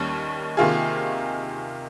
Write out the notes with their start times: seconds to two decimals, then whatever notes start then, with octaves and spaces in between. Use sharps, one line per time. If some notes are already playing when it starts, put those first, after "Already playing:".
Already playing: D#2 D#3 G3 C#4
0.57 C3 D#3 A#3 F4 G#4